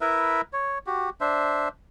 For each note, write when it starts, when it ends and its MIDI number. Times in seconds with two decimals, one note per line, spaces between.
0.01 0.41 64
0.01 0.41 70
0.01 0.41 71
0.01 0.41 76
0.53 0.78 73
0.87 1.10 66
0.87 1.10 67
1.21 1.68 62
1.21 1.68 72
1.21 1.68 76